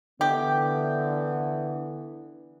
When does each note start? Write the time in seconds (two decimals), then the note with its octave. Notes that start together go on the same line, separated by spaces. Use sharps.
0.21 D3 E3 B3 G4